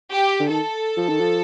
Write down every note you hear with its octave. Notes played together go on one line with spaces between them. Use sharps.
G4
D3
D#3 A4
F3
D#3
F3